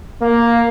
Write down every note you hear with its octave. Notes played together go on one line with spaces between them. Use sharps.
A#3